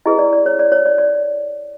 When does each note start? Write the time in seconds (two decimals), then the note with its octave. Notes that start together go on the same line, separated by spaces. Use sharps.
0.06 E4 G#4 B4 D#5
0.19 D5
0.33 D5
0.46 C#5
0.59 D5
0.72 C#5
0.86 D5
0.98 D5